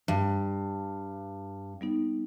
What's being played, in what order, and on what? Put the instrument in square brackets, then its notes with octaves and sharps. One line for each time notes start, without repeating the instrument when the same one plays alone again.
[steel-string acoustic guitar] G2
[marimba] G3 B3 D#4